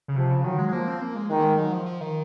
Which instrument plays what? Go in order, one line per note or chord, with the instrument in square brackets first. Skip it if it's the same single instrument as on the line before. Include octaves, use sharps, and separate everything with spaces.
[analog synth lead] C#3
[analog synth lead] C3 [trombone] F3
[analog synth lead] C#3
[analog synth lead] D#3 [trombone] F#3
[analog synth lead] G#3
G#3
[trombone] F3 [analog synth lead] A#3
[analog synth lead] C4
A#3
G#3
[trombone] D#3 [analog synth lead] G#3
[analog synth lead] A#3
G#3
F#3
F3
F3
D#3